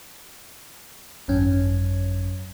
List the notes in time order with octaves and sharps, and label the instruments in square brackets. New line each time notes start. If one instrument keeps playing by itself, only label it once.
[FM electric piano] G#1 F#2 C#4